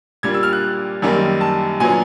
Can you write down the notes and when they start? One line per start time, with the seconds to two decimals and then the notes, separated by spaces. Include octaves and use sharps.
0.23 A#2 G3 A#3 D4 G#6
0.34 E6
0.43 F6
0.53 F#6
1.02 F#2 D#3 G3 A#3
1.41 A5
1.80 A#2 F#3 B3 D4 G#5